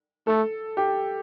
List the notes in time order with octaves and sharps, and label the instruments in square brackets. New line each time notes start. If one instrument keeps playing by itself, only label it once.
[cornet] A3 [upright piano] A4
[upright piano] G4